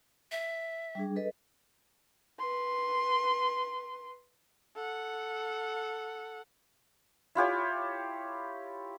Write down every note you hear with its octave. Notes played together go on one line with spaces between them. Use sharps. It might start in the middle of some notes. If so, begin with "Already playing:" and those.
E5
G3 D4 G#4
A4 B4 D#5
B4 C6
A4 F#5
E4 F4 G4 C#5